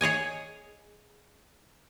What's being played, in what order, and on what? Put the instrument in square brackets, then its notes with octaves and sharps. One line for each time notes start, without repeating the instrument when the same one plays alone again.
[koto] G#4 C#5 D#5 G#5